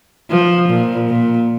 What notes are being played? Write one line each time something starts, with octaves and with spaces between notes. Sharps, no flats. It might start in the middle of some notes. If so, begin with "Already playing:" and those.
F3
A#2
A#2